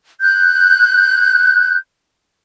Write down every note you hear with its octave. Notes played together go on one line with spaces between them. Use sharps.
F#6 G6